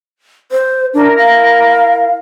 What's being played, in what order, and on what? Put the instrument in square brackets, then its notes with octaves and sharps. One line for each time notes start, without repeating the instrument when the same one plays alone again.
[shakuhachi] C5
[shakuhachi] D4 [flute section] E4 A#4
[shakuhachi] F5